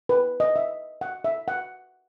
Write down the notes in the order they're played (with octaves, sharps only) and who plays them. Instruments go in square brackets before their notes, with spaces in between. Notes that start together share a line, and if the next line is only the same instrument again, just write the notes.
[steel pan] B4
D#5
E5
F#5
E5
F#5